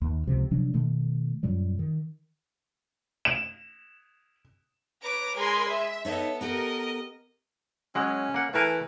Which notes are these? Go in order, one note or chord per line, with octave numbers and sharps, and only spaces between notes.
D#2
C#2 C3 F3
C3 F3 F#3 D4
B2 D#3 A3
F#2 A#2 F#3 G3
D#3
E7
B4 C#5 A#5 D6
G#3 A#4 G#5 B5 C6
E5
B3 D#4 A4 C#5 D#5
B3 G4 A4 A#4 D#5
F#3 G#3 C#4
A#3 F#5
E3 A3 A#4 G#5